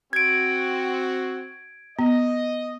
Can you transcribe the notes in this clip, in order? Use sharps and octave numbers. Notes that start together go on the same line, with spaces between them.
C4 F#4 G#6 D7
B3 D#5